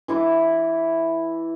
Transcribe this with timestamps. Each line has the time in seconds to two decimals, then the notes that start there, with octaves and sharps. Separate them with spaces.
0.08 E3 E4 D6